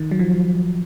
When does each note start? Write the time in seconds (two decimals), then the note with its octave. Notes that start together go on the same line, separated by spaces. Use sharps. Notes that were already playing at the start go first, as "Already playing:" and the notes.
Already playing: D#3
0.11 F#3
0.19 F3